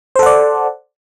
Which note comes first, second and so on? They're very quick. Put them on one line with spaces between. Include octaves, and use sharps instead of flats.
C5 A4 F#5 D5